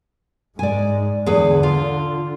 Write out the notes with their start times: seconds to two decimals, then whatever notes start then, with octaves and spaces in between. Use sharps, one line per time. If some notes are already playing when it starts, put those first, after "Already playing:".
0.59 G#2 G#3 D5 G#5
1.26 E2 D3 G#4 B4
1.63 F4